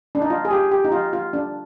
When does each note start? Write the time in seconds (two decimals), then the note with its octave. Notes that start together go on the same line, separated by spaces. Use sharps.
0.15 D4
0.22 D#4
0.30 F4
0.45 G#4
0.51 G4
0.71 G4
0.84 D#4
0.92 F4
1.13 F4
1.33 D4